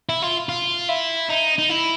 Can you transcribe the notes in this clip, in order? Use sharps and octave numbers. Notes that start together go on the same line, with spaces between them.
E4
F4
F4
E4
D#4
D#4
E4